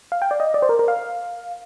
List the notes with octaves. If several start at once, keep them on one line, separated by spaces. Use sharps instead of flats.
F5
G5
D5
D#5
D5
C5
A#4
A#4
F5